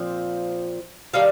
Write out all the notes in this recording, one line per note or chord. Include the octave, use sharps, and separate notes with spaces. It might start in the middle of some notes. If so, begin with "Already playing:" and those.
Already playing: A#2 F3 C4
D#3 G3 F5